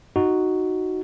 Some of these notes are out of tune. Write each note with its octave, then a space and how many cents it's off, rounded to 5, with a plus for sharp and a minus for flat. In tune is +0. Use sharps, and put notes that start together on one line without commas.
D#4 +0 F#4 +0